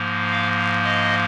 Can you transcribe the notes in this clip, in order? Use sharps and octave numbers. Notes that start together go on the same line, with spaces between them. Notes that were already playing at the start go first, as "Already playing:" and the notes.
Already playing: G#2 F3 A#3
F5
D#5